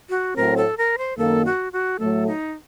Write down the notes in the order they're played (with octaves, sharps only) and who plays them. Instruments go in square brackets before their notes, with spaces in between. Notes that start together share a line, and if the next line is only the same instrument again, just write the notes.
[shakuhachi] F#4
[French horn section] A2 F#3 A3 C4 F#4 [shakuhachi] A#4
[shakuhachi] A4
A#4
C5
[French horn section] F#2 D#3 A#3 [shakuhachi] A4
[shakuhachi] F#4
F#4
[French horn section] A2 F#3 A3 [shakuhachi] A4
[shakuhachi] D#4